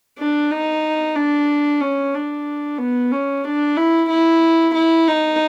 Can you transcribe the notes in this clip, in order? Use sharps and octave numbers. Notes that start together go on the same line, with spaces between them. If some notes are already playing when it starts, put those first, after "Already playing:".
D4
D#4
D4
C#4
D4
B3
C#4
D4
E4
E4
E4
D#4